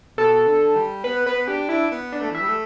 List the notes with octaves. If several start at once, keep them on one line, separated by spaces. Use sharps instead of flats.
B2 A4
D3
G3
B3 B4
B3 B4
D4 G4
D4 E4
B3
D4
A3
E3 E5
G3
A3